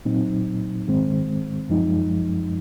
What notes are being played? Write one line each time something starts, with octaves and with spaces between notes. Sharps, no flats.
A#2 F#3 C4 D#4
G#2 D#3 G#3 C4
F#2 F3 G#3 D#4